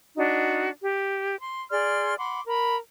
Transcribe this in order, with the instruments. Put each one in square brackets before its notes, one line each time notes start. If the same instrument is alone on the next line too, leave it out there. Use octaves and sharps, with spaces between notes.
[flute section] D4 D#4 F#4
G4
C6
G#4 D5 C6 F6
F#5 B5 C6 D6
A#4 B5